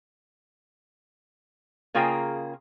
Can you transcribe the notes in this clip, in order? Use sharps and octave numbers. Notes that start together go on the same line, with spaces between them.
C#3 A#3 F4 G#4 G5 A#5